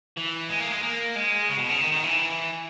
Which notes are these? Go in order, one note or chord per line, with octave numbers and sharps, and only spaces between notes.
E3
G#3
A#3
G#3
A#3
G#3
C#3
B2
C#3
D#3
D#3
E3